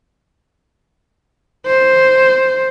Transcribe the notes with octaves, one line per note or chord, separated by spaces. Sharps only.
C5